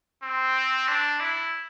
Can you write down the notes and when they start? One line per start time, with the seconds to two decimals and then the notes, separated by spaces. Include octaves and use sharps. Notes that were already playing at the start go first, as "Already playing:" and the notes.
0.23 C4
0.88 D4
1.20 E4